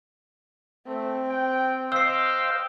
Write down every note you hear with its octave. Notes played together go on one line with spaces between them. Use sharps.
A3 C4
G5
C5 D#5 F5 G5 E6 C7